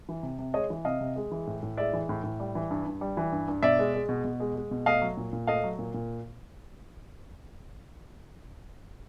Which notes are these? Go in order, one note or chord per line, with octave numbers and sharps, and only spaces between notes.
E3
C3
C3
G#3 C#5 D#5
E3
C3 D#5 F5
C3
G#3
E3
A2
A2
G#3 D5 E5
E3
A2
A2
G3
E3
G2
G2
G3
E3
G2
G2
B2 D5 E5
G#3
G#3
B2
B2
G#3
G#3
B2
A3 D#5 F5
F#3
A#2
A#2
A3 D#5 F5
F#3
A#2
A#2